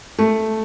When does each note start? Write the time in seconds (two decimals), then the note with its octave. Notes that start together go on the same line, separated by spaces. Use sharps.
0.19 A3